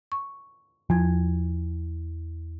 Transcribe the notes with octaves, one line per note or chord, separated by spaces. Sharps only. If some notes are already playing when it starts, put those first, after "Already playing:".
C#6
E2 F3 G#6